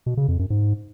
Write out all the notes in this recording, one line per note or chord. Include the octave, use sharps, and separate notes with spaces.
B2
C#3
F2
F#2
G#2